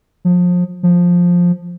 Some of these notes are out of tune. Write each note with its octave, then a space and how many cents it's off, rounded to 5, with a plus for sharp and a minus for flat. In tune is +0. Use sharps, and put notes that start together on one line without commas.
F3 +30
F3 +10